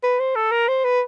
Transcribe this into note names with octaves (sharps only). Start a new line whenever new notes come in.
B4
C5
A4
A#4
C5
B4